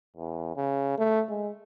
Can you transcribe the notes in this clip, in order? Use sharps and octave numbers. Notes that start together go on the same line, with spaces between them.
E2
C#3
A3
G#3